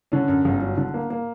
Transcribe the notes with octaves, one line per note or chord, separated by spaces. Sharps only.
D3 C#4
F#2
G1
F#3
D3
A#3
A#3